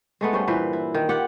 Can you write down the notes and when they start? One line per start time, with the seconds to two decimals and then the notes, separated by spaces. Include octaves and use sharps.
0.21 G#3 A3 B3
0.33 G2 C#4 C5 F#5
0.48 A#2 E3 B4 C5
0.73 E4
0.95 D#3
1.09 F4 G4 F#5